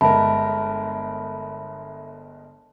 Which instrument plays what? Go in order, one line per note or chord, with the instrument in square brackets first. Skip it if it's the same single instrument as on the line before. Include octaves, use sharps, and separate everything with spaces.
[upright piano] G1 G#3 A#4 [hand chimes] E5 B5 [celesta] A5